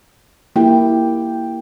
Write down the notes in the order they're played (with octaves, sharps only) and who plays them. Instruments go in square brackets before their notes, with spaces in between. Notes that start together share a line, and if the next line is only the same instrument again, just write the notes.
[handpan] A#3 E4 G4 [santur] G5